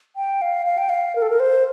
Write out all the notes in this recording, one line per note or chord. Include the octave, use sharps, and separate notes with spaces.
G5
F5
F5
G5
F5
A#4
A4
A#4
C5